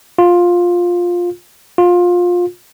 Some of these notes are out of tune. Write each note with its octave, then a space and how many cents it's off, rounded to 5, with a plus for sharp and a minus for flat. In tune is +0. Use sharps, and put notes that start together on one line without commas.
F4 +10
F4 +20